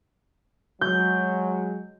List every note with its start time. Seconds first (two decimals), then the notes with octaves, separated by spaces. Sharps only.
0.81 F#3 G#3 G6